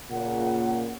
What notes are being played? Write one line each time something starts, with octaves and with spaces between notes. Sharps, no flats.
A#2 C#3 F#5